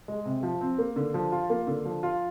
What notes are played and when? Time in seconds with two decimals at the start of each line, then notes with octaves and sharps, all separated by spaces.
0.08 G#3
0.25 C3
0.43 F3
0.61 C4
0.78 A#3
0.96 D3
1.14 F3
1.32 F4
1.50 A#3
1.67 D3
1.85 F3
2.03 F4